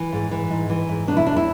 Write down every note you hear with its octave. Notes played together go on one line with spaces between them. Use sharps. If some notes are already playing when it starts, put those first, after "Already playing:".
Already playing: E3
G#2
E3
G#2
E3
G#2
B2 D4
E4
E2 D4
E4